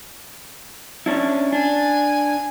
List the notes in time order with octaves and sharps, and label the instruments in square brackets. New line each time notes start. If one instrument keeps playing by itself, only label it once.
[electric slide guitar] C#4 D4 E4
[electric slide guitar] D4 [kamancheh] G#5